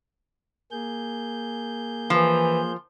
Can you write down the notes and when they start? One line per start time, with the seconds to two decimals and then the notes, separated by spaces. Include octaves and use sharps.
0.72 A#3 G#4 G6
2.10 E3 F3